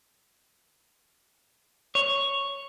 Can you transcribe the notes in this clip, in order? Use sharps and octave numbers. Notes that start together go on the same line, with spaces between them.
C#5